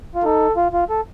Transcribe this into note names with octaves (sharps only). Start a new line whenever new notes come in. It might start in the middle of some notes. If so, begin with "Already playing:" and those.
F4
D#4 A4
F4
F4
A4